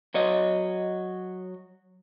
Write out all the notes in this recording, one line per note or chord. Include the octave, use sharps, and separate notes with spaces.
F#3 C#5 D#5